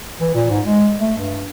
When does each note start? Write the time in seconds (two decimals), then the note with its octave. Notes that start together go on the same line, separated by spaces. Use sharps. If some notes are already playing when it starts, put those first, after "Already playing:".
0.21 E3
0.35 A#2
0.50 G#2
0.66 G#3
1.00 A3
1.18 G2